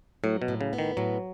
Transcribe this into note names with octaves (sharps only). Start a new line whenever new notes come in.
A2 F#3
B2
A2
C#3
B3
D#3
A2 F#3